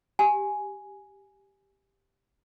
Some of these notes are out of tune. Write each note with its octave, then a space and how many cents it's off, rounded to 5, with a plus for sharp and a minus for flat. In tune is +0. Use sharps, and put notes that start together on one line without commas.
G4 +0 G#5 +0